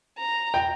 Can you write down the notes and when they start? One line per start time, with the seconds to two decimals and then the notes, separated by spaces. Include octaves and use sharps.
0.19 A#5
0.54 G5